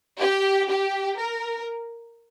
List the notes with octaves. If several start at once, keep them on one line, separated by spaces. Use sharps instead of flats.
G4
G4
A#4